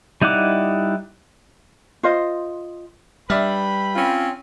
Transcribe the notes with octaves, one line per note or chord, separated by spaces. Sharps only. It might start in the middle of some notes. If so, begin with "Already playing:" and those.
G3 D#4 E4 F#5 D6
F4 C5 D#5
G3 D4 B4 E5 G5 B5 F6
C4 C#4 F4